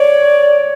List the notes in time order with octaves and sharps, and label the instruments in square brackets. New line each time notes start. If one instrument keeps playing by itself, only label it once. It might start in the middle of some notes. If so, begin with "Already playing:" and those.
Already playing: [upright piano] C#5 [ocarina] D5